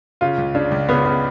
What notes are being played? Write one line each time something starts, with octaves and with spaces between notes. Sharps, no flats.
C#3 F4
C#2
C#3 D4
C#2
C#3 B3
C#3